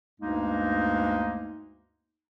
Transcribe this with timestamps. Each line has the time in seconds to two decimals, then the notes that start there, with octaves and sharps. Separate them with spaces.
0.21 D2 G2 G#3 A#3 D#4